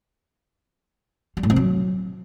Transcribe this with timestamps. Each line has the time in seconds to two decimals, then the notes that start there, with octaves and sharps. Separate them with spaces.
1.37 G3
1.43 A2
1.50 C3
1.56 F#3